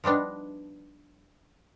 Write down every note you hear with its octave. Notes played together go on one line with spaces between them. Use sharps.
F3 G3 B3 D4 D#4